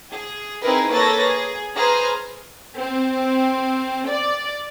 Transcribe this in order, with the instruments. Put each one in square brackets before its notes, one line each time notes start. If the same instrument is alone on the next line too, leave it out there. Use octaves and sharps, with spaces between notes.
[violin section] G#4
C4 D#4 E4 G#4 A#4 B4
A#3 A4 B4 C#5 A6 A#6
G#4
G#4 B4 C5 A#5 F6
[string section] C4
D5